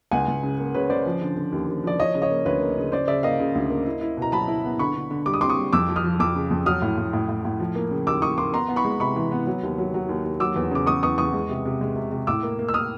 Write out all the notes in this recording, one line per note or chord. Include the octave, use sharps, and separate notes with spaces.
C#2 F#5 G#5
C#2
C#3
A#3
C#3 B4 C#5
C#3 C5 D5
F3
D3
D3
D#2
D#2
F3 D5
F3 C#5 D#5
C#3
C#5 D#5
A#3
D2 B4 C#5
A#3
C#3
C#3 C5 D5
C#3 D5 E5
A#3 D#5 F5
C#3
D2
A#3
E4
E4
B2 A#5
F#3 A5 B5
E4
B3
D3 B5 C#6
D3
D3
G3 D6
D#6
C4 C6 D6
C#6 D#6
G3
F2 D6 E6
F3
D#6 F6
F3
F2 D6 E6
C#3
F2
F#3 D#6 F6
A2
A2
A2
A2
A2
F3
A#3
C#3
D#2 D6 E6
D#2 C#6 D#6
A#3 C6 D6
B3 A#5 C6
B3
B5 C#6
G#3
C3 B5 C#6
E3
B3
F#3
D#2
F#3
F#3
D#2
D#2
F#3 D6 E6
E2
C#3 D6
E2 C#6 D#6
E2 C#6 D#6
E2 C#6 D#6
G#3
C3
C3
G#3
C3
C3
A2 D6 E6
A#3
A#3
E6
A#3 D#6 F6